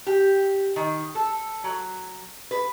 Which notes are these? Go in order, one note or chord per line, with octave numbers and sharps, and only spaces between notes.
G4
D#3
A4
F#3
B4